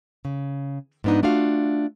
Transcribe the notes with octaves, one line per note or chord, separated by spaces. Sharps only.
C#3
G#2 F3 B3 D4 D#4
A3 D4 F4 F#4 F5